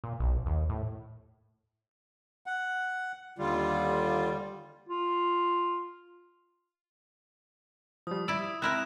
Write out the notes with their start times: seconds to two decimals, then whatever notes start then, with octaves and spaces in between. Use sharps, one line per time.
0.04 A#2
0.20 B1
0.46 D#2
0.69 A2
2.46 F#5
3.38 D#2 D3 G3 F4
4.89 F4
8.07 F3 G3 D#6
8.28 E4 D5 E6
8.62 C4 E4 A#4 F#6 E7